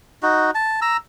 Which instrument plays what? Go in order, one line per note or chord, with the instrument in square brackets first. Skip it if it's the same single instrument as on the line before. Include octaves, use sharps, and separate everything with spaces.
[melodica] D#4 F#4
A5
A#5 E6